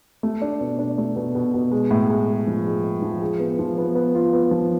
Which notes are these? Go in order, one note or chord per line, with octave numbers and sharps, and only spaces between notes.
A3
D4
B2
D4
A3
B2
B2
B2
G#3
A2
G#3
G#3
F3
G#3
G#3
F3
G#4
B3
F3
B3
B3
F4
B3
F3